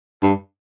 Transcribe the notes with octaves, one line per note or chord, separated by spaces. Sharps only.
G2